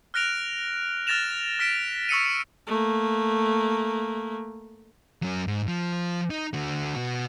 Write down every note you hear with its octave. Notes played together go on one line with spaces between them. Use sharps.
F6 F#6 A#6 D7 F7
F6 F#6 A6 A#6 E7 F7
F6 B6 D7 E7
C#6 E6 C#7 D#7
A3 A#3
F#3 C#4
G#2
F3
D#4
D3 F#4
B2 F#4